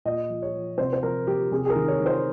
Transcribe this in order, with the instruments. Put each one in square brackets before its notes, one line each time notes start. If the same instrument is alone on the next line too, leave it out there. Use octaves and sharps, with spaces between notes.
[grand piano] A#2 D#5
F3
C#5
F3
C3 C5
C5
F3 A#4
F3 G4
C3 G#4
G#4
A#4
D#3
C#5
D#3
C5